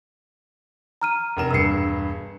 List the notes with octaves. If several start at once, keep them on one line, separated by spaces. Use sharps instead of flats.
A#5 F6 D#7
F1 A#4 E7
E1 G2 E6 C7 C#7